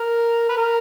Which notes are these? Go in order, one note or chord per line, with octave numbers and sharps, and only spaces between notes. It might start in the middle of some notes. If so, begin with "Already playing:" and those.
Already playing: A#4
B4
A#4